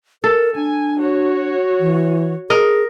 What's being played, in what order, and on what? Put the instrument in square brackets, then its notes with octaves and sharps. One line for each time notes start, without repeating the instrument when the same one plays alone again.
[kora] A4 [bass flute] A#4
[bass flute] D4 [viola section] G#5
[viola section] F#4 C#5
[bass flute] E3
[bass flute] G#4 [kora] A#4 D#5